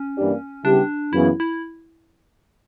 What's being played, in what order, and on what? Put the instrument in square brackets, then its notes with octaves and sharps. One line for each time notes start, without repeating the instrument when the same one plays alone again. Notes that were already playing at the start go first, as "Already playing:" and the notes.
Already playing: [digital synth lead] C#4
[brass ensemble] G2 E3 A#3 D4 G4
[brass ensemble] C#3 G3 B3 E4 G4 [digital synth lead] D4
[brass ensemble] F#2 C#3 E3 B3 [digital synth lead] E4
[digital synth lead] E4